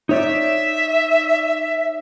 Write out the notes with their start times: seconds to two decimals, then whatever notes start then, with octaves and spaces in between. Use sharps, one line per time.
0.09 D#4 C#5 D5 E5